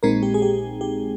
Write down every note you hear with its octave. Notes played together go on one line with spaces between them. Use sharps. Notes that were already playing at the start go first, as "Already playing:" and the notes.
A#1 A#2 G#3 C4 D#4 A#4
G4
G#4
G4
G4